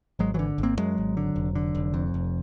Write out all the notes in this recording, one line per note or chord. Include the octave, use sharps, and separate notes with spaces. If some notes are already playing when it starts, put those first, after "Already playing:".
G#1 F#3 G#3
D3 E3 F#3
G#1
A#3 C4
F#2 F#3 G#3
G#1
D3
F1
D3
F1
F2
F1